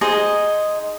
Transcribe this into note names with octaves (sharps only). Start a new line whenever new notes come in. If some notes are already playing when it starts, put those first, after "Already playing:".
D#4 G#4 C5 D#5